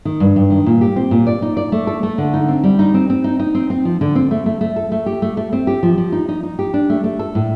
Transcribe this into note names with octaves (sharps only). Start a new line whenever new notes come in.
D#3
G2
G2
D#3
A#2
G4
C4
A#2
D5
D#4
D5
A3
A4
A3
D3
D#4
C4
G3
D#4
C4
C4
D#4
D#4
C4
C4
F3
D3
C4
A3
A3
A3
A4
A3
G4
A3
A3
C4
G4
F3
F3
D#4
D#4
D#4
G4
D4
A3
A3
A4
A2